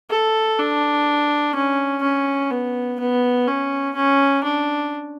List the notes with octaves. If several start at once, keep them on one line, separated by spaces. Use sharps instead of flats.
A4
D4
C#4
C#4
B3
B3
C#4
C#4
D4